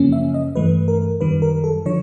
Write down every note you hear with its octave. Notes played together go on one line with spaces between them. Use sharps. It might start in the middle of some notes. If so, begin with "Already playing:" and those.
Already playing: F#2 C#3 F3 A#3 C#4
E5
D#5
G2 E3 A3 B4
A#4
F#2 D#3 G3 B4
A#4
A4
D3 F3 C#5